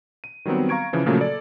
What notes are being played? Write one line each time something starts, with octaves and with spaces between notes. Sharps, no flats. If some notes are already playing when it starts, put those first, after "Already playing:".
D#7
D#3 F#3 G3 B3 C4
F5 A#5 C#6 G#6 D7
C#3 E3 F3
A#2 C#3 F3 F#3 A3 A#3
A4 D5